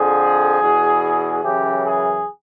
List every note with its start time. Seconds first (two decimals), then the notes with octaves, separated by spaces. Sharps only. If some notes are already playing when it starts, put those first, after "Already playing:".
Already playing: F2 D3 F3 G#4
0.62 E2 B2
1.43 F#2 C#3 E3 G4
1.85 G#4